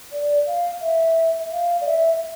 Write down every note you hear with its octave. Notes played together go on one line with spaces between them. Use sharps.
D5
F5
E5
F5
D5
E5